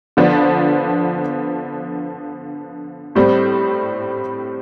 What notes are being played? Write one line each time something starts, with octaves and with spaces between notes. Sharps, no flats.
D3 F3 B3 D4
A2 G3 C4